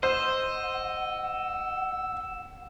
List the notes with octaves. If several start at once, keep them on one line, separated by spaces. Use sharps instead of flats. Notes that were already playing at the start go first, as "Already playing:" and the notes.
C5 D#5 F#5 E6